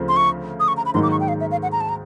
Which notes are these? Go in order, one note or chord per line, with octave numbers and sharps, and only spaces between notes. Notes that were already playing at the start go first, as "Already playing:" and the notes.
Already playing: D2 C#3 F3 A3 C4
C6
C#6
D#6
C#6
A#5
B5
G#2 D#3 F#3 A#3 D#4 C6
D6
C#6
G5
F5
E5
F5
F#5
A#5
A5
A#5